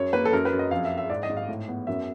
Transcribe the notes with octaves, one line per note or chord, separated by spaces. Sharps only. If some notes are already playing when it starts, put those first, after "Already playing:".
Already playing: F#2 C#5
A#3 B4
A4
F#2 A#4
B4
F#2
D#5
F2 F5
E5
F2
E5
G#2 D5
D#5
G#2
F5
A2
B3
F#2 E5